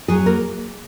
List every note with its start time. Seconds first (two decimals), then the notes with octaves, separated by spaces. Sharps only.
0.08 F#3 G#4
0.26 A#3 A#4